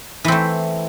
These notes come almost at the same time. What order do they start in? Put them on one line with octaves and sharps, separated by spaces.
E3 C4 A3